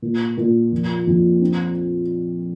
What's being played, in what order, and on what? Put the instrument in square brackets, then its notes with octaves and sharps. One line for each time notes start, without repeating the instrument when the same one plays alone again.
[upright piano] A#2
A#2
F2
F2
C4